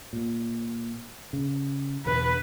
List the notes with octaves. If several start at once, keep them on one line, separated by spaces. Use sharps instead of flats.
A#2
C#3
E2 B2 D3 B4